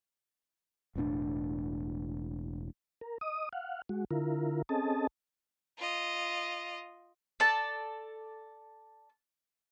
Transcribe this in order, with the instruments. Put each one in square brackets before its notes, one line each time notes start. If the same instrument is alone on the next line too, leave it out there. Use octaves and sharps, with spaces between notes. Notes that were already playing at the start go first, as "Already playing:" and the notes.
[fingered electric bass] E1 A2 C4 D4
[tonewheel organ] A#4
D#5 D#6
F5 F#5
G#3 F#4
D3 E4 F4 A#4
C4 C#4 G#4 A4 D#5 A5
[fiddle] F4 D#5
[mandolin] A4 D5 A5